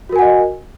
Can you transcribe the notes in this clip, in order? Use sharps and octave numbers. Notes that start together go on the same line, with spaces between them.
F#4 A#4 D#5 F#5 G#5